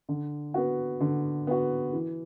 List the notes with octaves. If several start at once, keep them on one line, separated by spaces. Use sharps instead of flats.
D3
B3 F#4
D3
B3 F#4
E3